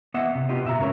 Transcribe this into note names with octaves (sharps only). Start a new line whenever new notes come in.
B3 D#5 E5 F#5
C3
B3 F4 G4 D#5
B2 E5 F5 A#5
G#2 C#3 F4 A#4 C#5